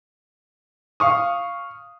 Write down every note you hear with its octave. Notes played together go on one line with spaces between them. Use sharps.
F5 C#6 D#6